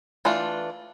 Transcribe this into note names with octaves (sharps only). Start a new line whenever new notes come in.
E3 A3 D4 F4